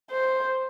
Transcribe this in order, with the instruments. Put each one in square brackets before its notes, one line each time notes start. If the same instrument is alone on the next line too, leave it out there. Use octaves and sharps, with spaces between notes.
[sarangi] C5